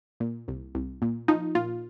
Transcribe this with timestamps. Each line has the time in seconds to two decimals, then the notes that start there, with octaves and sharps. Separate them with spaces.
0.20 A#2
0.48 C2
0.75 C2
1.02 A#2
1.28 F3 D#4
1.55 A#2 F4